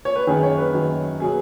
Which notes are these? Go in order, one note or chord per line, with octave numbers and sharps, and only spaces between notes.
C#5
B4
F#2 D#3 F#3 G#4
C#5
B4
F#2 D#3 F#3
B2 F#3 G#4